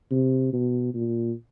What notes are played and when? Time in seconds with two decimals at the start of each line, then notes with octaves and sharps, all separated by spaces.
0.11 C3
0.53 B2
0.94 A#2